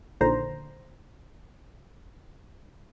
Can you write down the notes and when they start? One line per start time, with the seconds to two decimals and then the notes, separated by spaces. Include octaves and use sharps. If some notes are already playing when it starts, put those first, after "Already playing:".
0.20 A#1 A#2 D3 D#3 C5 A#5